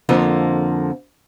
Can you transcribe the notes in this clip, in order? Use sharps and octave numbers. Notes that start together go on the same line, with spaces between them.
F2 D3 F3 A#3